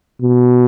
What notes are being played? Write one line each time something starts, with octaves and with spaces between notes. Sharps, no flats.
B2